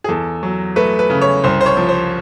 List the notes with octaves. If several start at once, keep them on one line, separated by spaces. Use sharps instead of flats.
G#4
E2 A4
F#3
A3 B4
B4
C#3
C#5
C2 C5
C5
C#5
F3
C5